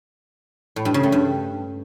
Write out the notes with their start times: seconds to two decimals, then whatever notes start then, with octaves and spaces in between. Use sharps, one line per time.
0.76 A2
0.85 G2
0.94 C#3
1.03 A3
1.12 G2